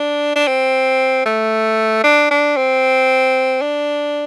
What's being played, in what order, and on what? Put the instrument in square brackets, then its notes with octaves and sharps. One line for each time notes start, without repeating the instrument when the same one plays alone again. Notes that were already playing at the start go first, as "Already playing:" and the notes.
Already playing: [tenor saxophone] D4
D4
C4
A3
D4
D4
C4
D4